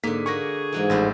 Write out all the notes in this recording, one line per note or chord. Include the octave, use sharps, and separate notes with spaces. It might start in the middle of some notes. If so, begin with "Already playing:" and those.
G#2 D3 A#3 B6
A#3 F#4 G#4 A#4 C#6 A#6
G#2 E3 F#3 G#3
A1 F2 E4 C5